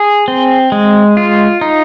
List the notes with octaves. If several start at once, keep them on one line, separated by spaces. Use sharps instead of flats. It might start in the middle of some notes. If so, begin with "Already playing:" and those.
Already playing: G#4
C4
G#3
F4
D#4